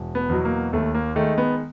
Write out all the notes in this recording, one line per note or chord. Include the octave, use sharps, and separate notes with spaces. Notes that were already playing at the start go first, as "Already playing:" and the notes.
Already playing: E1
B3
E2 B2 F#3
A#3
D#2 A3
A#3
D#3 G#3 A3
B3